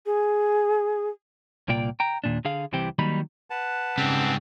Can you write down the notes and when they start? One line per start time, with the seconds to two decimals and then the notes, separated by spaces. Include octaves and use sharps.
0.05 G#4
1.68 C2 A#2 A#3 F4 D5 G5
2.00 G5 A#5
2.24 D#2 A#2 D4
2.45 D3 G#4 F5
2.72 C2 C3 E3 C4 G4
2.99 D#3 F#3 G3 A#3 D#4 B5
3.50 B4 F#5 A5
3.98 G#2 C#3 G3 C4